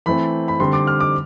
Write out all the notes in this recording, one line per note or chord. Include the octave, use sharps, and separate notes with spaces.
E3 A3 C4 B5
B5
D3 G3 C4 C6
D6
F6
D6